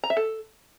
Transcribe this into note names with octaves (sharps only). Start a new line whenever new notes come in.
A#5
E5
A4